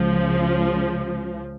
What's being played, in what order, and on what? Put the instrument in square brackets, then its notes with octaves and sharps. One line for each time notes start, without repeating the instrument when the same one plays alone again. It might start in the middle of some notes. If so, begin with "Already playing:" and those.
Already playing: [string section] C#2 C#3 F3